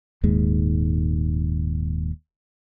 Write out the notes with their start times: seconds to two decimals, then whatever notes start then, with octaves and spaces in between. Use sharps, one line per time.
0.23 D#1 D#2 G#2 G#3